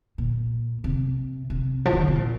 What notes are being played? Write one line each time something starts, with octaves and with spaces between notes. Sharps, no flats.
A#2
C3
C3
F3
D#3
C#3
C3
A#2